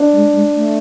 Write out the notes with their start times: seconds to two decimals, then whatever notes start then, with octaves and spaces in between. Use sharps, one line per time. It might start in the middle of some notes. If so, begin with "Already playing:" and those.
Already playing: D4
0.13 G#3
0.33 G#3
0.54 A3